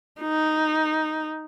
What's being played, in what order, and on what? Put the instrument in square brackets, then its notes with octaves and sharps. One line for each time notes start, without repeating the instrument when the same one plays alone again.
[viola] D#4